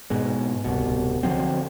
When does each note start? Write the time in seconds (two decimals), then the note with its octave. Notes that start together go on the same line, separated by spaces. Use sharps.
0.10 G#2 B2 G#3
0.64 D1 C2 B2
1.23 D3 F3 F#3 C4